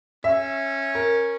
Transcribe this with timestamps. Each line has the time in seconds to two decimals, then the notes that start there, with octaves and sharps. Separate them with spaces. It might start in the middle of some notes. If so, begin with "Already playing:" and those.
0.24 C#4 E5
0.95 A#4